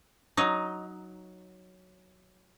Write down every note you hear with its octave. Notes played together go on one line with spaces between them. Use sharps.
F#3 D#4